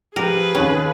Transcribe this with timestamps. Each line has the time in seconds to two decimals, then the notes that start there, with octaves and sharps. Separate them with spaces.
0.16 F3 G4 G#4 A#4 B4
0.55 D#2 C#4 B5